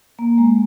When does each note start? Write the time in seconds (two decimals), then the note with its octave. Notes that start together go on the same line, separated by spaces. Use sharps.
0.19 A#3
0.38 G#3